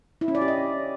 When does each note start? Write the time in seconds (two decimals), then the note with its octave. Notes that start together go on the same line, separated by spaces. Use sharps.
0.21 E4
0.28 C#4
0.35 D5
0.41 G4
0.48 D#5